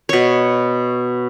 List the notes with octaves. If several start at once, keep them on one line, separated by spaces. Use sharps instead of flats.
B2 C#5